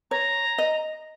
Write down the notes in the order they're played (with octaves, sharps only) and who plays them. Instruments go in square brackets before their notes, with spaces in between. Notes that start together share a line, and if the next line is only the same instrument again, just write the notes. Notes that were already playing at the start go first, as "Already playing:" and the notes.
[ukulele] C#5 [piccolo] A#5
[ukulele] D#5